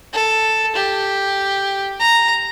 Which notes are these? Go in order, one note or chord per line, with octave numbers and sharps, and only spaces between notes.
A4
G4
A#5